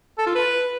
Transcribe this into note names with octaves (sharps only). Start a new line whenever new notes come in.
A4
F4
B4